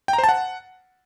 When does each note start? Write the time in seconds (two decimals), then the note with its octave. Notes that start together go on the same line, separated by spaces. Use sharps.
0.08 G5
0.13 A#5
0.18 C5
0.24 A5
0.29 F#5